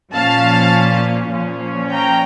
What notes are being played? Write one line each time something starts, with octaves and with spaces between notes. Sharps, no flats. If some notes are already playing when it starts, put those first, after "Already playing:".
A#2 F3 C#4 F5 A5
A#2 F3 C#4
G5 A#5